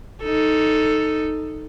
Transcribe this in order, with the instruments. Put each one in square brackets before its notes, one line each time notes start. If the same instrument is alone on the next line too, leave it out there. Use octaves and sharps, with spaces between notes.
[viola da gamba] D#4 A4